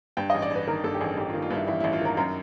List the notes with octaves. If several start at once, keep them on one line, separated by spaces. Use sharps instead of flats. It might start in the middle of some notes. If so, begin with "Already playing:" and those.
G2 G5
A1 D#5
D5
A1 B4
D#3 A#4
G2 A4
G4
A1 G#4
A1 G4
F4
D#3
F4
G2 E4
A1 E4
A1 E4
F4
D#3 A#4
F#2 A#4